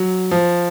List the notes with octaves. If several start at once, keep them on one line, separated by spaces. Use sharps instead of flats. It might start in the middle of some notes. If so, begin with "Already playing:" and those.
Already playing: F#3
F3